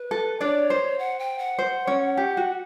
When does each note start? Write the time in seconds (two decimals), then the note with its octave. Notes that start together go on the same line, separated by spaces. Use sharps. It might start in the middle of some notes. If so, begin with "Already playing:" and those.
Already playing: B4
0.11 A4
0.41 D4 C#5 D5
0.70 C5
0.99 F#5
1.19 G5
1.38 F#5
1.59 C5
1.87 C#4 C#5
2.17 G4
2.37 F#4